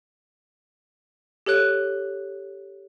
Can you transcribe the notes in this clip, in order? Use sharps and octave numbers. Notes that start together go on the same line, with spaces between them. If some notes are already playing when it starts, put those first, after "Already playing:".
G4 A4 C#5 F#6